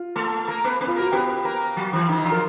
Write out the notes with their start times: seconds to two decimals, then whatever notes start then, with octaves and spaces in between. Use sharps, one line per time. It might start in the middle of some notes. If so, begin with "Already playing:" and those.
Already playing: F4
0.16 A3 A4
0.48 A#3 A#4
0.64 B3 B4
0.81 B3 B4
0.87 F4
0.96 A#3 F#4 A#4
1.12 B3 G4 B4
1.44 A#3 A#4
1.77 F#3 F#4
1.93 E3 E4
2.09 D#3 D#4
2.25 F3 F4
2.32 A#4